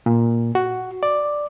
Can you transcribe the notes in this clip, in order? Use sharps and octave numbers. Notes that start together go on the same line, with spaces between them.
A#2
F#4
D5